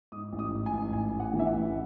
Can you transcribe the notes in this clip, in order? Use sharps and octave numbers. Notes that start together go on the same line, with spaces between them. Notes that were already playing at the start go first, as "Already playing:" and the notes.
G#2 D#6
A1
D#6
G#2
G#5
A1
A1 G#5
A1
F#5
E3
E5
F#5
A1